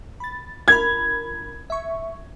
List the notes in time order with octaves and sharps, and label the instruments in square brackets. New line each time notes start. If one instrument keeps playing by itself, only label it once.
[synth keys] B5 A6
[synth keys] G1 A#4 B5 [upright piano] G#6
[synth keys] E5 C#6